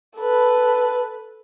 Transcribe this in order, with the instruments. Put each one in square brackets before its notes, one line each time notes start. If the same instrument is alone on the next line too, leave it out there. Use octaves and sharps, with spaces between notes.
[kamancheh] A4 B4